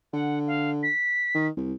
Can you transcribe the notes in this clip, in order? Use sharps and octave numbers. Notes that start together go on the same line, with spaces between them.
D3 F#5
F5
B6
D#3
C2